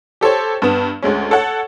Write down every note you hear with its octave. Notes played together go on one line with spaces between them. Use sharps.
G4 A4 C5 C#5
G2 B3 E7
D2 G#3 C#4
A4 C#5 F#5